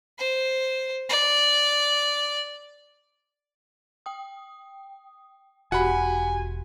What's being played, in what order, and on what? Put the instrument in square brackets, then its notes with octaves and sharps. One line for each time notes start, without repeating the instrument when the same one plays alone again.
[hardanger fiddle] C5
D5
[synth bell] G5 D#6
[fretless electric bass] E1 [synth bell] F#4 G4 [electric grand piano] F#5 B5 [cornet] G#5